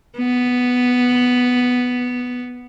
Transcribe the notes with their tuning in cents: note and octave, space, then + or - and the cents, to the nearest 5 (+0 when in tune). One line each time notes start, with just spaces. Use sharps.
B3 +0